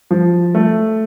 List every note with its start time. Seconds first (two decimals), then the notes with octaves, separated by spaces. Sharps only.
0.11 F3
0.55 A3